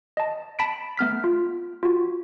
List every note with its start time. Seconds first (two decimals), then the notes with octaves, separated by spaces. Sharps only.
0.17 D#5 A5
0.59 A5 B5 B6 D7
0.97 A3 B3 F6 B6
1.24 F4
1.83 F4 F#4